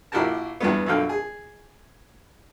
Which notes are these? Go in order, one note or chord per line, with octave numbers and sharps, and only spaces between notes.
A#1 E4 F#4 G4 A#4 A5
E2 G2 B3
F#2 B2 D3 F5 G5
G#4